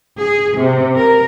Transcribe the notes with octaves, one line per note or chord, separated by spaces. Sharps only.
G#4
C3
A#4